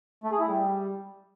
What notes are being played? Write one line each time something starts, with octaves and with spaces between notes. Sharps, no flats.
A3
G#4
E4
G3